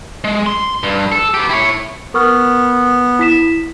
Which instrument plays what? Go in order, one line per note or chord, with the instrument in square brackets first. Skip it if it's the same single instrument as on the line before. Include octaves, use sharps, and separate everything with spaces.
[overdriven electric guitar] G#3
C6
G2
A4
B3 G4
E4 C#5
[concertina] B3 [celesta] A#4 C#6 F6
[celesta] E4 B6 E7